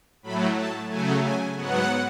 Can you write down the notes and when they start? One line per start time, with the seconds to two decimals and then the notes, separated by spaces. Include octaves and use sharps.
0.23 A2 F#3 A3 B5
0.56 A5
0.89 C#3 F#3 A3 G#5
1.23 G#5
1.56 G#2 F#3 B3 F#5